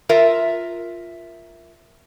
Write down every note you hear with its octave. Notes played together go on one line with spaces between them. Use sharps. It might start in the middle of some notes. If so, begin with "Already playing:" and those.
F4 A#4 E5